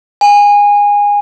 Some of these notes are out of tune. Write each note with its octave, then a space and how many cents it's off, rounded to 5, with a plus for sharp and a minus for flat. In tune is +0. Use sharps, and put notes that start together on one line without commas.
G#5 -20